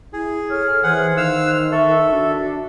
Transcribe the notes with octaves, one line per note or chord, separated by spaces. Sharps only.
E4 G#4
A4 C#5 F6
E3 G#4 C5 F#5
D#3 F5 E6 F#6
A4 E5 C#6
D4 F#4